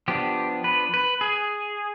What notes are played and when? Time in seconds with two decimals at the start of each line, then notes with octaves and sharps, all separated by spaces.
0.08 F3 B3 D4 G4
0.64 B4
0.94 B4
1.21 G#4